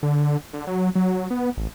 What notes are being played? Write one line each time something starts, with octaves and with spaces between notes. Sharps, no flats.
D3
D3
F#3
F#3
B3
A1